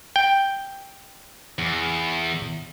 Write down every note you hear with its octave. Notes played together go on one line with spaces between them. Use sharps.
G5
E2